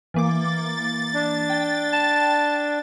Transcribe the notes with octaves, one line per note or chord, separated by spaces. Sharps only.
E3 A#3 D6 A6
D4
G5
A5